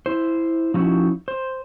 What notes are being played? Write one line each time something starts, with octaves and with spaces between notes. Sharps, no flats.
E4 C5
F3 F#3 C#4 D#4 E4 F#4
C5